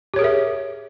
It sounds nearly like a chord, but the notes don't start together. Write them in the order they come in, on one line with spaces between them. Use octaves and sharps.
G4 C#5 G#4 A#4 E5